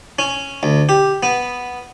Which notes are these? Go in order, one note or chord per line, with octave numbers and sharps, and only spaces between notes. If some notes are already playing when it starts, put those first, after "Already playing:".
C#4
D2
G4
B3